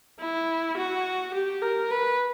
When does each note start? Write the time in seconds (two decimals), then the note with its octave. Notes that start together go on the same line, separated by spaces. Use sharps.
0.20 E4
0.77 F#4
1.33 G4
1.62 A#4
1.91 B4